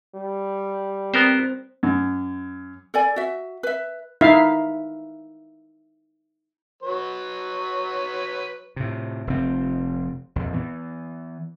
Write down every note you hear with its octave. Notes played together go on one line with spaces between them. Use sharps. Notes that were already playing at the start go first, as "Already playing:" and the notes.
G3
B3 C4 A#4 C5
F#2
A4 D5 G#5
F#4 E5
B4 E5
D#4 E4 E5 F5
F#3 B4 C#5
A2 C3
F1 C4
A#1 F2
E3 B3